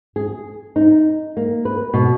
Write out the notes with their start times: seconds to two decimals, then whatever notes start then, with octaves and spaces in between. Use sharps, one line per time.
0.16 G#4
0.76 D#4
1.37 A#3
1.65 B4
1.94 B2